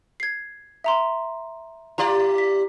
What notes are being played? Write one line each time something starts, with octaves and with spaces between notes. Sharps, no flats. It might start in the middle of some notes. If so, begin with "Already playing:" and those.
G#6 C7
E5 A#5 C6
E4 G4 D5 A#5
B6